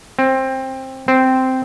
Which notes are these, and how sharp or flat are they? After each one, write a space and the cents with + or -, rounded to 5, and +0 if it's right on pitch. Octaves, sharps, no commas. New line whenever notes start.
C4 +15
C4 -10